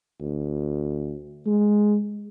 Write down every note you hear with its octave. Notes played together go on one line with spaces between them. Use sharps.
D2
G#3